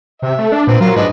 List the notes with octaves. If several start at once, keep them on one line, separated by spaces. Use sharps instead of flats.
C3 E5
A3
D4
A#2 B3 C4
F#3 F4 A#4
G#2 D4 B4 D#5